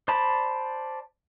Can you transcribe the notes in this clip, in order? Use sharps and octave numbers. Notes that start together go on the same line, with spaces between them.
C5 D5 A5 B5